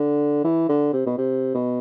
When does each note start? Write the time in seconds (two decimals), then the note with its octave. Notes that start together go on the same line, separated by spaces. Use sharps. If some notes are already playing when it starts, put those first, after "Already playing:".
Already playing: D3
0.44 E3
0.69 D3
0.93 C3
1.06 B2
1.18 C3
1.54 B2